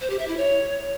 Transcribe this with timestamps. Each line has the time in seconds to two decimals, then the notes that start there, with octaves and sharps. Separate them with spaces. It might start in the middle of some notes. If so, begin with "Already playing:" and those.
0.01 C5
0.10 G4
0.19 E5
0.28 E4
0.37 C#5